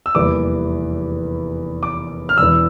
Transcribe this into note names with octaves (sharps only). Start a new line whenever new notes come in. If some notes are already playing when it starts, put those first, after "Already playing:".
E6
F1 E2 E3 G3 A#3 D6
D6
F6
E1 E2 E3 E6